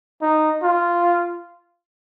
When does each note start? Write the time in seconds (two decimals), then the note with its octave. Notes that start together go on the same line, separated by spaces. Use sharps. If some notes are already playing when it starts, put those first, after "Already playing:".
0.22 D#4
0.63 F4